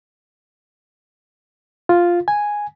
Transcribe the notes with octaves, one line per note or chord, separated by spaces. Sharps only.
F4
G#5